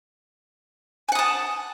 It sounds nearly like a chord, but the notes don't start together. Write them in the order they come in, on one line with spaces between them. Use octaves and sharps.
G#5 F#5 D#6 A5